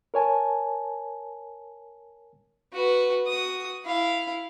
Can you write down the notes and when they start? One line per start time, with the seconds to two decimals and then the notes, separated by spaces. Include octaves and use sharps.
0.14 A#4 C#5 G#5 A5
2.72 F#4 B4
3.27 F#4 D#6
3.85 E4 F5